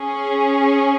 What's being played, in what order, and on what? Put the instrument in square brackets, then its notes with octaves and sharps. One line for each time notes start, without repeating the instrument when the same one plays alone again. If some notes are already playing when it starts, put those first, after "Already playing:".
Already playing: [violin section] C#4 G#4